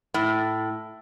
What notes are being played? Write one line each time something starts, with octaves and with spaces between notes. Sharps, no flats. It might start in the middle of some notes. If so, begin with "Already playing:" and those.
A2